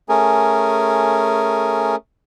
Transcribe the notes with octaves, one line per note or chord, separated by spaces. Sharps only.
A3 C#4 G#4 A#4